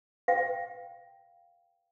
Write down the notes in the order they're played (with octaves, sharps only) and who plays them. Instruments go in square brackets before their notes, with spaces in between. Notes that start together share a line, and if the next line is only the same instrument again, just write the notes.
[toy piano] F5 G5